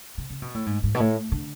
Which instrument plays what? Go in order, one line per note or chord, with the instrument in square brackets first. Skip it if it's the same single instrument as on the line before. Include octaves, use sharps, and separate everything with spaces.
[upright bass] C#3
C#3
B2
A2
G#2
G#2
B2
A2
D3